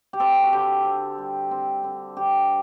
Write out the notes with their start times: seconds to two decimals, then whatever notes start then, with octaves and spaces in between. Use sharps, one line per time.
0.13 G4
0.20 C4 A4
0.43 F#4
0.53 D3 G4
0.85 C4
1.18 G3
1.51 C4
1.84 D3
2.17 D3 G4